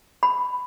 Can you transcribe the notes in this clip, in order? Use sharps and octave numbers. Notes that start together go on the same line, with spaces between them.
B5